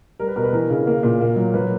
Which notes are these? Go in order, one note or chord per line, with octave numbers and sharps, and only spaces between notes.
G3 A#4
B4
B2 A#4
B4
E3 A#4
C#3
A#3
A#2
A#3
F#3
F#3 B4